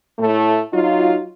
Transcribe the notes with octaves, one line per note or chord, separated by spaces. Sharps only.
A2 A3
F#3 D#4 F4